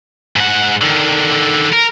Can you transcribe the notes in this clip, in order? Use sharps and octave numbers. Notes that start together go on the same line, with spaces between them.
G#2 F#5
D3 D#3
A#4